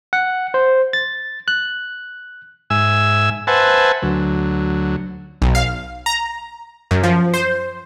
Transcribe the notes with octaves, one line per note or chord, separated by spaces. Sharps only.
F#5
C5
A6
F#6
G#2 E5 G#5 E6
B4 C5 E5 F#5 G#5 A5
D2 F#3
B1
F5
A#5
F#2
F3
C5